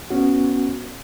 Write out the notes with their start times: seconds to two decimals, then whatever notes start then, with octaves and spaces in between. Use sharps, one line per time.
0.10 B3 C#4 F#4